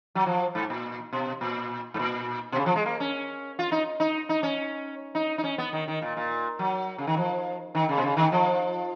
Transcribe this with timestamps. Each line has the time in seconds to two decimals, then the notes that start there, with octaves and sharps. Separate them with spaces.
0.15 F#3
0.26 F3
0.55 G#2
0.70 A#2
1.13 B2
1.41 A#2
1.94 G#2
1.99 A#2
2.52 B2
2.56 C#3
2.66 F3
2.76 G#3
2.86 A#3
3.00 C#4
3.59 F4
3.72 D#4
4.00 D#4
4.29 D#4
4.43 C#4
5.15 D#4
5.38 D#4
5.44 C#4
5.58 B3
5.73 D#3
5.88 D#3
6.02 A#2
6.17 A#2
6.59 F#3
6.98 C#3
7.07 D#3
7.17 F3
7.75 D#3
7.89 C#3
7.98 B2
8.03 C#3
8.17 D#3
8.32 F3